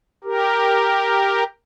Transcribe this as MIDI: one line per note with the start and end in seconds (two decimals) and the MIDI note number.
0.24 1.44 67
0.24 1.44 70